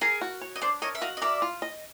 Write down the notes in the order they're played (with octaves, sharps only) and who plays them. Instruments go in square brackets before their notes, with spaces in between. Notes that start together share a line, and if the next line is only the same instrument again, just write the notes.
[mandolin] G#4 [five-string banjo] A#4
[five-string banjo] F#4
C#5
[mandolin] D#5
[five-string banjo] D4 [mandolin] C5 D5
[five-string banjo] A#4 [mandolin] C#5 D#5
[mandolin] E5
[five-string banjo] F#4 [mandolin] D#5 F5
[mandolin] D#5
[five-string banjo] A#4 [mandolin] D5 E5
[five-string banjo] F4
D#5